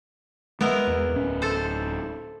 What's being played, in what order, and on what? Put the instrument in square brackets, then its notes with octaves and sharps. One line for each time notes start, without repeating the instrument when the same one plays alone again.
[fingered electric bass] G#3 [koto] B3 E4 A#4
[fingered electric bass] E2
D1 C#4
[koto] A4 C5